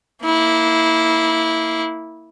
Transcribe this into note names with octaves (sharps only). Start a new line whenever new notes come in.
A#3 E4